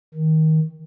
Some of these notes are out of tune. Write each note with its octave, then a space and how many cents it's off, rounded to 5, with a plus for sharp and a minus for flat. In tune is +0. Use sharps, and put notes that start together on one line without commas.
D#3 +20